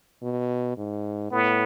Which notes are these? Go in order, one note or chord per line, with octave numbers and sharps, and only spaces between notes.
B2
G#2
A2 B3